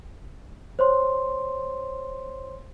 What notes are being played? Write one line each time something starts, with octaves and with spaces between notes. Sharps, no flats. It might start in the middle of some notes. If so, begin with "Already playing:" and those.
C5 C#5 C6